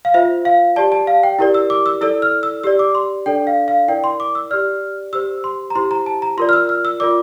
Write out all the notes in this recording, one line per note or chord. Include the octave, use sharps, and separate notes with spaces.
F5
F4 C5 E5
F5
G4 D5 A5
A5
F5
G5
E4 G4 A#4 D5
E6
D6
E6
E4 A4 D5 E6
F6
E6
G4 D5 E6
D6
C6
D4 A4 D5 G5
F5
F5
E4 A#4 D5 G5
C6
D6
E6
G4 D5 F6
G4 C5 E6
C6
A#5
E4 G4 C5 C6
A#5
A5
A#5
F4 A#4 D5 C6
F6
E6
F6
E6
F4 A#4 D5 D6